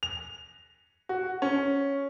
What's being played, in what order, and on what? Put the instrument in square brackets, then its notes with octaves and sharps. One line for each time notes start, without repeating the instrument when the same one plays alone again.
[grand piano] F7
F#4
C#4